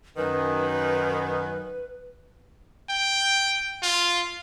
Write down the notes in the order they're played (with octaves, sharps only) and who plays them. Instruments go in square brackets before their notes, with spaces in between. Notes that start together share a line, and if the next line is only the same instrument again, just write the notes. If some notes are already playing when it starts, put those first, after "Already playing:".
[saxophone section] F#2 D#3 [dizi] B4
[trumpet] G5
F4